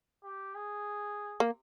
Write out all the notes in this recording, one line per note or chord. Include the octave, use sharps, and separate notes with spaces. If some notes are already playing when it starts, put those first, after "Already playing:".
G4
G#4
A#3